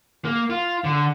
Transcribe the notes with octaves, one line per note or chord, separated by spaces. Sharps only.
A#3
F4
D3